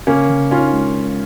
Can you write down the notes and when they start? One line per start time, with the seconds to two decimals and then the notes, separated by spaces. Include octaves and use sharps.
0.07 C#3 A#3 C#4
0.30 C#3
0.51 C#4 D#4 F4
0.73 G#3